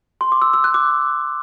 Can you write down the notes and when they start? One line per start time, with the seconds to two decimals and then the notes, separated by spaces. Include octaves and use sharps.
0.21 C6
0.32 D6
0.42 E6
0.54 E6
0.64 F#6
0.74 D6